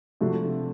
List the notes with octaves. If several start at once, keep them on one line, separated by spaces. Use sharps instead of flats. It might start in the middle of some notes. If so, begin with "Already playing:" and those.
C3 F3 A3 D4 F#4